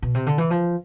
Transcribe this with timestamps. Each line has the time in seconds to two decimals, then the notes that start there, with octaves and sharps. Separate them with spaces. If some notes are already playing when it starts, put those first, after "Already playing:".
0.02 B2
0.15 C3
0.27 D3
0.38 E3
0.50 F3